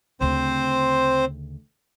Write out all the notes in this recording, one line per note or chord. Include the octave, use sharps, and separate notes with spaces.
D2 C#3 C4 C5